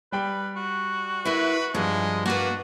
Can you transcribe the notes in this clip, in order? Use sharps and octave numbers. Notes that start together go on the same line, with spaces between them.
G3 B4 G5 B5
F#4
E4 A#4 B4 E5
G2 F3 G#3
A#3 D4 F#4 B4